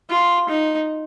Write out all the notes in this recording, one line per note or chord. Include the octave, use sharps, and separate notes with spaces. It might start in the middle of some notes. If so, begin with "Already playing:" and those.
F4
D#4